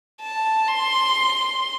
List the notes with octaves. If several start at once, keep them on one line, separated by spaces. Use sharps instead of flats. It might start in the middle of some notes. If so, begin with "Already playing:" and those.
A5
C6